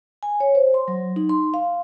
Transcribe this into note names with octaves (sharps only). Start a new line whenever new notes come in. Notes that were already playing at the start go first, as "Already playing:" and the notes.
G#5
C#5
C5
C6
F#3
D#4
C6
F5